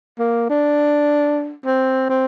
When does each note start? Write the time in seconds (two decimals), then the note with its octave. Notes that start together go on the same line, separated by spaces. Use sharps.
0.19 A#3
0.49 D4
1.65 C4
2.09 C4